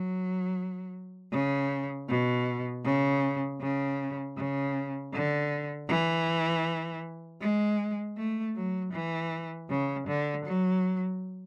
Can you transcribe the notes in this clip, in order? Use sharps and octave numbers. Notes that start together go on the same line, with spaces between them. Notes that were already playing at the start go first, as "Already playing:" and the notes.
Already playing: F#3
C#3
B2
C#3
C#3
C#3
D3
E3
G#3
A3
F#3
E3
C#3
D3
F#3